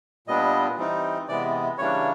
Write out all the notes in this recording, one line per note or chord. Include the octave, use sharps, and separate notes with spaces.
A#2 G3 B3 D4 D#5
E3 G3 C4 D#4
C3 E3 G#3 B3 D5
C#3 E3 G3 A#3 D4 C#5